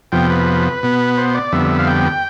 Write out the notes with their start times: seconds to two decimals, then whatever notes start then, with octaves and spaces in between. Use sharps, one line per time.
0.12 F2 C3 F3 B3 G5
0.30 B4
0.83 B2 B3
1.18 C5
1.34 D5
1.52 F2 D3 G3 B3 E5
1.79 F5
1.87 G5